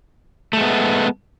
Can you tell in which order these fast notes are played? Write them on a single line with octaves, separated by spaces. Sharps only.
A3 G#3 B3